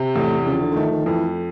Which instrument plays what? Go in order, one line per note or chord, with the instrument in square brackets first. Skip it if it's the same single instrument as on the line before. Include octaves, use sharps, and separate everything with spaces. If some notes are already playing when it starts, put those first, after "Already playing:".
Already playing: [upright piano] C3
[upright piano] E2 [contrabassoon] A2
[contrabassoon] C#3 [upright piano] F3
[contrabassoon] D3
D3
[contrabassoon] D#3 [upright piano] A3
[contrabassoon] D#3
[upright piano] F2 [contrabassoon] E3